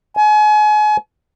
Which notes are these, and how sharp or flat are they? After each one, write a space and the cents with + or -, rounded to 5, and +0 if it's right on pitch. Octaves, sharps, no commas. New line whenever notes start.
G#5 +35